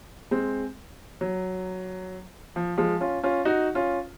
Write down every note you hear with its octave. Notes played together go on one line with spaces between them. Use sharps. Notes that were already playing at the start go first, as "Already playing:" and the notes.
G#3 C4
F#3
F3
F3 G#3
C#4 F4
C#4 F4
D#4 F#4
C#4 F4